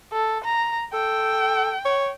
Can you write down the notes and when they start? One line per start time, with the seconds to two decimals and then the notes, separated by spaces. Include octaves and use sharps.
0.12 A4
0.44 A#5
0.93 A4 G5
1.85 C#5